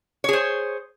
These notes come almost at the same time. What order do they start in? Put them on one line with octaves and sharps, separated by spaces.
C#5 G#4 C5